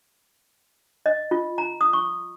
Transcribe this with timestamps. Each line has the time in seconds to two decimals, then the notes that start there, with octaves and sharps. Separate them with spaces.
1.06 D#5
1.31 F4
1.58 A#5
1.81 D#6
1.93 C#6